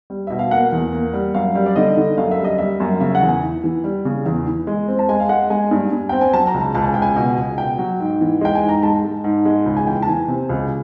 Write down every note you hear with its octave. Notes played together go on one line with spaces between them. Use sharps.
G3
B2 E5
F5
A#3 F#5
E2
A#3
G3
F#2 F5
G3
D5
D3 D#5
D3
F#2 F5
E5
G3
D#5
G3 E5
F#2
C#3 E5
F#5
E2
G#5
E3
E3
G3
C#3
E2
E3
G#3
C4
A5
G#3 G#5
F5
G#3 F#5
G#3 G#5
G2
G2
C4 G5
G#5
F#3 A5
A#5
C#2
A5
C#2 A5
G#5
C#2 G5
G#5
B2
C#2
B2 G5
F#3
G#2
E3
G#3 G5
G#5
G#2
A#5
G#3 A5
G#3
G#2
G#3
C#2
G#5
E3 G5
A5
E3 G#5
C3
C#2